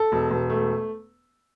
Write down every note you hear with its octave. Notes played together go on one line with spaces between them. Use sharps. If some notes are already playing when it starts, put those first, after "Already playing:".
Already playing: A4
E1
E1
A3